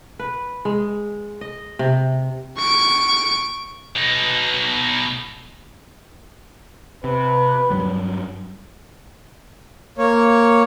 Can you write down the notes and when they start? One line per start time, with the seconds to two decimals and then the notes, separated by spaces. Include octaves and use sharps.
0.19 B4
0.65 G#3
1.41 D#5
1.79 C3
2.57 C#6 D7
3.97 B2 D#4
7.04 C3 B4
7.70 G2 F#3 G3
9.98 A#3 C#5